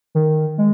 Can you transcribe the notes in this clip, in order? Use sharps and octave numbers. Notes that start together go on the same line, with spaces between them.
D#3
G#3